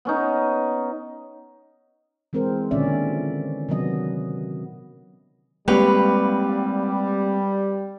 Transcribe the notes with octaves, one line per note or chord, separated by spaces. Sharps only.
B3 C#4 D#4
E3 G#3 C4 A#4 C5
A#2 D3 D#3 C#4 D5 E5
C3 D#3 F#3 B3 D#5
G3 G#3 A#3 C4 G4 B4 C#5